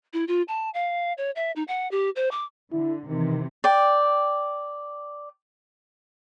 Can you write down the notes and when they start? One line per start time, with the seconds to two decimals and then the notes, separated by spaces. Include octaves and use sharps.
0.13 E4
0.28 F4
0.48 A5
0.74 F5
1.18 C#5
1.36 E5
1.56 D#4
1.68 F#5
1.91 G4
2.16 C5
2.31 D6
2.72 D3 E4
3.08 C3 D#3 E3
3.64 D5 G5